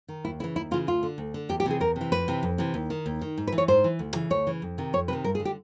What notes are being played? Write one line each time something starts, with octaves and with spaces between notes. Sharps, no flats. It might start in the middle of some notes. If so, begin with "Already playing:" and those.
D#3
D#2 E4
C#3 E3 E4
D#2 E4
C#3 E3 F4
D2 F4
D3
D2
D3
E2 G4
G4
C3 E3 G#4
E2 A#4
C3
E3
F2 B4
C3 E3
F2
C3 E3
D#2
D#3
D#2
D#3
G#2
B4
E3
C#5
G#2 C5
E3
D2
C#3 E3
D2 C#5
C#3 E3
F2
C3 D#3
F2 C#5
C3 D#3 B4
G2 A#4
G#4
D3
G4